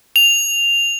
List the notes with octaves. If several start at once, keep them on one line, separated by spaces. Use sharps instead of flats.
F7